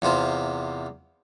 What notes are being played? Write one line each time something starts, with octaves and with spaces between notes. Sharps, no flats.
E2 C3 F4 C5